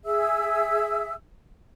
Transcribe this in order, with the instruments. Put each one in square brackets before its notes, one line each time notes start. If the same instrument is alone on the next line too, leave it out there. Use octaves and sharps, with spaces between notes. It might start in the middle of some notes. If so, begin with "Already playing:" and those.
[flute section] G#4 E5 E6